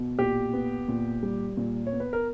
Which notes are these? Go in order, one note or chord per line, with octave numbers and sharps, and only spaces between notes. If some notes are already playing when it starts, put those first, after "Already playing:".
Already playing: B2
A#2 G4
B3
A#2
G3
A#2
C#5
B3
B4
A#4